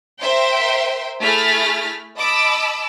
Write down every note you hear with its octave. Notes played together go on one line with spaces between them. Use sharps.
A#4 C5 E5 G5 C6
A3 E4 G#4 F6 A6 B6
D#5 A5 B5 D6 E6